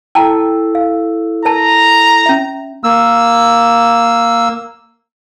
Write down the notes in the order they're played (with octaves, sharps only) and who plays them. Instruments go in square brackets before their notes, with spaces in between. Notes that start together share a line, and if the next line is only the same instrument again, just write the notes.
[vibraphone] E4 A4 [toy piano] G5 A5 A#5
[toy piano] F5
[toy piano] A#4 A5 [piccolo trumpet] A#5
[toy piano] C#4 E5
[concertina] A#3 E6